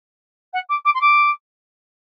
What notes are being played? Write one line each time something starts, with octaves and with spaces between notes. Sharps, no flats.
F#5
D6
D6
C6
D6